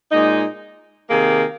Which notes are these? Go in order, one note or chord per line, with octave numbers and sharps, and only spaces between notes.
A#2 G#3 D#4
C3 D#3 A#3 G#4